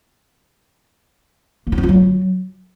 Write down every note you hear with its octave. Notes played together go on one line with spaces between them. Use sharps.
A#3
D#4
C4
F4
F#3